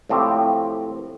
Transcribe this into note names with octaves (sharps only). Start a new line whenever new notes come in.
A2 F3 C4 G4